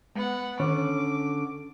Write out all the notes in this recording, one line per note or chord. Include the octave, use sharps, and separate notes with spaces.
G#3 B3 F#5
D3 D#3 C#4 D6